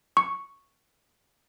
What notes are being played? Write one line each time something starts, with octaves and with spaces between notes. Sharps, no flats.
C#6